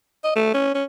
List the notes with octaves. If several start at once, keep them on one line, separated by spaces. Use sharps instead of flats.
D#5
A3
C#4
C#4